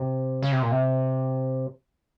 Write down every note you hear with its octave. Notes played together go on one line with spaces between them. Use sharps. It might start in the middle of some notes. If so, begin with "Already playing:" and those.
Already playing: C3
C#3
C3
A#2
C3